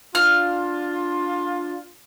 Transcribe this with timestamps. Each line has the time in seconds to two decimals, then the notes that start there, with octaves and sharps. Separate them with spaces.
0.15 D4 F4 F6